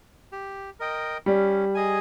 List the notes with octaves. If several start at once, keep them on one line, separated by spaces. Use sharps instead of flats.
G4
A#4 D#5 G5
G3 C#4
G#4 D#5 G#5